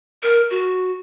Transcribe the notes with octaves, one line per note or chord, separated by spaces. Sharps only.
A#4
F#4